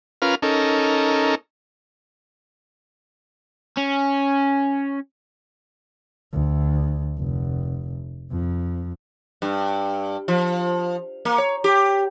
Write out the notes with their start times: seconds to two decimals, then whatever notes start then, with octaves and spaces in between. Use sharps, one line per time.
0.22 C#4 F4 A#4 B4 F6
0.42 C#4 D#4 A4 A#4
3.77 C#4
6.33 D2
7.19 F1
8.32 F2
9.42 G2
10.28 F3
11.25 A#3
11.38 C#5
11.64 G4